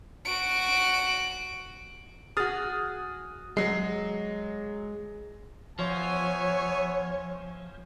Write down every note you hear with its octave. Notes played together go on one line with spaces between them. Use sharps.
F#4 D7
F#4 G#4 D#6 F6 A6
F#3 G#3 C7
F3 B3 C#5 E5 G#5